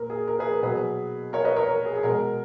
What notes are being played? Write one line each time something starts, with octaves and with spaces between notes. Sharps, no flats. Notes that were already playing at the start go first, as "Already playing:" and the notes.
Already playing: A#2 A#4
G#4
A#4
G#4 B4
A#4
B2 F#3 G#4 B4
A#4 C#5
B4 D#5
A#4 C#5
A#4
G#4
G#4
B2 G#3 A#4